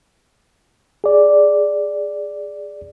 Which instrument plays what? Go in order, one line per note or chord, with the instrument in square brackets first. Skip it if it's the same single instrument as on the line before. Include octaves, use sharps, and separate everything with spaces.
[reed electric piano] G#4 D5